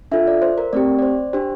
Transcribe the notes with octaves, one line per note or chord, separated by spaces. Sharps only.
D4 F4 A4 E5
D5
C5
A#4
A3 C4 G4 D5
D5
C5
D4 G4 C5